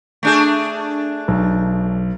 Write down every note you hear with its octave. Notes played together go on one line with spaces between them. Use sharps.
A3 D4 G#4
B1